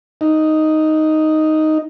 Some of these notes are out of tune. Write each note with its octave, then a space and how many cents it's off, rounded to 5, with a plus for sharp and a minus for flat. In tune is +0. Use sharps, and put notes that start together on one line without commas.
D#4 +0